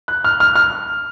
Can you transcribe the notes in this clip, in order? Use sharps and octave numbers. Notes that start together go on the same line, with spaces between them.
F#6
F6
F6
F6